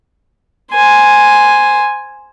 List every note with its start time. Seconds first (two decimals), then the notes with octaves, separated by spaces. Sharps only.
0.73 C5 G#5